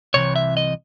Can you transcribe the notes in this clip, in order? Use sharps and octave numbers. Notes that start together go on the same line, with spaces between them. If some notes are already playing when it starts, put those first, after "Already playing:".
C2 C3 E3 C#5
E5
D#5